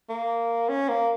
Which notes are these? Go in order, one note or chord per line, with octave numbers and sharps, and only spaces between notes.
A#3
C#4
A#3